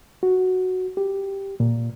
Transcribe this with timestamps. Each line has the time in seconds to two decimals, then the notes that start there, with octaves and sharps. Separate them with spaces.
0.23 F#4
0.97 G4
1.60 A#2